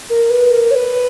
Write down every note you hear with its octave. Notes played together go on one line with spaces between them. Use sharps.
A#4
B4
A#4
C#5
B4